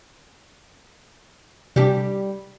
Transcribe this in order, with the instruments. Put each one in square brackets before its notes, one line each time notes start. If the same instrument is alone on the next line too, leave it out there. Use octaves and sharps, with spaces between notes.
[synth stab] C3 D4 [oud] G3 G4